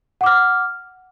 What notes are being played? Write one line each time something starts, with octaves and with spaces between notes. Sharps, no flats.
F#5 D6 F6